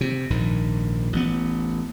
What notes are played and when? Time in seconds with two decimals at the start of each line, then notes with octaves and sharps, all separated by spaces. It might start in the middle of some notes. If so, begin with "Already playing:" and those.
0.01 C3
0.30 A#1 G#2 D#3
1.13 A1 B3